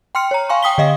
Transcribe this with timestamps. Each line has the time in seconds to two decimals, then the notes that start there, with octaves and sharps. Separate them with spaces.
0.15 G5 C6 F6 C#7
0.31 C#5 A#5
0.49 F5 G#5 C6 C#6
0.62 G5 D#6 B6 G7
0.78 D3 D#5 F5